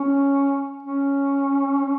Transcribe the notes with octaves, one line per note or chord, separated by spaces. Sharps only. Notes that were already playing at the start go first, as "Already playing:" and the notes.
Already playing: C#4
C#4